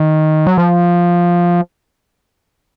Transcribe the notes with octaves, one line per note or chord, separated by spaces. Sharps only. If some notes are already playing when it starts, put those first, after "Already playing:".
Already playing: D#3
F#3
F3